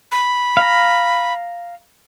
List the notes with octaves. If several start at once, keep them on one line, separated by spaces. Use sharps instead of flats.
B5
F5 A#5